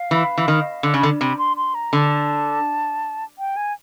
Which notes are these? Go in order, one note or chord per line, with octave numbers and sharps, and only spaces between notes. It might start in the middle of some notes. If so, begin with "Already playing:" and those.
Already playing: F5
E3
E3
D#3
D3
C#3
D3
C3 B5
C6
C6
A#5
D3 A5
G5
G#5